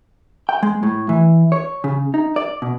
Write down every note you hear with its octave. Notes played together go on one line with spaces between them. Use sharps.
G5
G#3
A2
E3
C#5
C#3
D#4
D5
B2